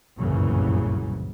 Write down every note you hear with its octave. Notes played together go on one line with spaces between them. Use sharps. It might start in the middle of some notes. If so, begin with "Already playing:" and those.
G1 C2 F#2 A#2 C#3 E3